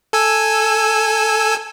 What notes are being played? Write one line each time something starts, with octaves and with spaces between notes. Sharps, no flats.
A4 G#5 E6